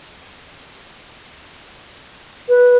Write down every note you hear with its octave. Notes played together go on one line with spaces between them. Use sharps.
B4